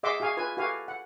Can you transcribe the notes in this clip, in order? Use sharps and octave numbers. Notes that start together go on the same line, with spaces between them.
G#4 D#5 E5 F#5 C6 D6
F#4 G#4 F5 G#5
F4 B4 G#5
F#4 G4 A4 B4 F5 G#5
F#5